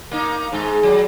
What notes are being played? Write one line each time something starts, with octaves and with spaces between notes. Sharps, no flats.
A#3 D#4
G#2 G#3
F#3 G3